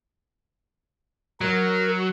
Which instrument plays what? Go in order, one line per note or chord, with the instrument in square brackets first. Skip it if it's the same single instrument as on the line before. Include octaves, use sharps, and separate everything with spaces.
[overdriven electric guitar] F#3 [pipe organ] A#4